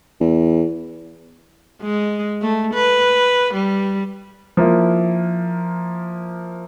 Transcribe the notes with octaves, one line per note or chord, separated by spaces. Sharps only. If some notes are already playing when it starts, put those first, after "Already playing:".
E2
G#3
A3
B4
G3
F3 A#3 E4